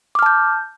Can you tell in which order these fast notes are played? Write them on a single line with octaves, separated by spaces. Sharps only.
D6 F6 A5 G6